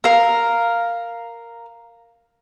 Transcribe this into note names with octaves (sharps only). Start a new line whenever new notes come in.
A#4 F5